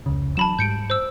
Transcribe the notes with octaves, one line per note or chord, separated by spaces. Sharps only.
F1 C#2 C#3
E3 F#3 D4 A5 B5 E7
G#2 G3 G6 C#7 D7
C5 E6